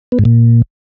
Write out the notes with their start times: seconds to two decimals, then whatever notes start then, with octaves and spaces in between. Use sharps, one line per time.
0.12 B3
0.19 G#2
0.25 A#2